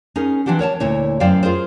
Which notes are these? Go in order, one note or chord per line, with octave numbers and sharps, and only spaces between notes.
C#4 D#4 G#4 A#4
E3 C4 D4 G4 F#5
A#4 C#5 F#5 A5
D2 A#2 E4 C#5
F#2 C5 D5 F5 G5
F4 G#4 A#4 C5